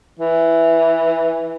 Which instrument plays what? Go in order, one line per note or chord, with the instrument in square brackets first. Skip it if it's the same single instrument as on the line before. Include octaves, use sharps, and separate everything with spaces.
[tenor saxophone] E3